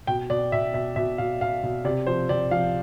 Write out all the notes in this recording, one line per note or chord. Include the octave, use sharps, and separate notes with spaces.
B2 G5
B2 D5
B2 E5
B2 E5
B2 E5
B2 F5
B2 F5
B2
C3 D5
F3 C5
C3 D5
F3 F5